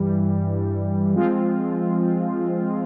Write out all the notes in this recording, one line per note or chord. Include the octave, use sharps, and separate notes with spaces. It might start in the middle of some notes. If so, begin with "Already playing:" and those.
Already playing: G2 E3 G3
F3 G#3 C4 F4